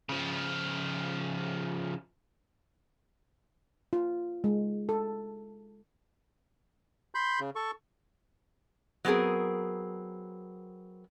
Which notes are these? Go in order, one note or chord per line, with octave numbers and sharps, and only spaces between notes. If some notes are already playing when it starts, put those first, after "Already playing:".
C#3 F3
F4
G#3
A4
B5 C6 G6
C#3
A4 C#6
F#3 B3 C4 G#4 A#4